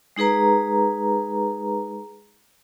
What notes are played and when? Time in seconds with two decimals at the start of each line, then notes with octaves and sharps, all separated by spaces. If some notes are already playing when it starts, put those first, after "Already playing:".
0.16 G#3 D#4 G#4 B4 A#5